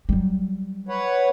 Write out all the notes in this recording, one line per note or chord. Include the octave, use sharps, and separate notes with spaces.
F#3 G3
B4 C#5 F#5